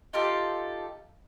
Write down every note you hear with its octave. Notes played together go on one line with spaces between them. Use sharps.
D#4 F4 G4 A4